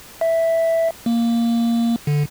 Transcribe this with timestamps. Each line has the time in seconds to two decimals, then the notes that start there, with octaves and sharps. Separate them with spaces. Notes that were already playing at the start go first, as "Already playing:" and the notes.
0.21 E5
1.06 A#3
2.07 D3